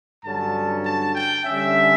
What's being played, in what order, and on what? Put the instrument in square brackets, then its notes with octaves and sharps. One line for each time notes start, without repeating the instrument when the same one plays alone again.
[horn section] G2 D3 F#3 C#4 A5
A5
G5
D3 G3 C#4 E5